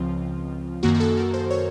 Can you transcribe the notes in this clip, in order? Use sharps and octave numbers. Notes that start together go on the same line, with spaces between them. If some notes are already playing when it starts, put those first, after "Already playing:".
Already playing: C#2 C#3 F3 C4 F4
F#2 D#3 A#3 F#4
F#4
A4
A#4
C5
C#5